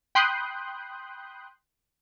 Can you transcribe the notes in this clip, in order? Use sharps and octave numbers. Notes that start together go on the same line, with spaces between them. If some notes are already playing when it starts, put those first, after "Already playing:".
G5 B5 C6 D#6 F#6 G6